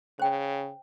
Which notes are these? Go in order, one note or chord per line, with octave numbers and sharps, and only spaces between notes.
C#3 C5 G5